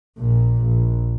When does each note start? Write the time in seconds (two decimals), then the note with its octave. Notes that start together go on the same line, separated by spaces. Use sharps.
0.17 A#1 A#2
0.62 A#1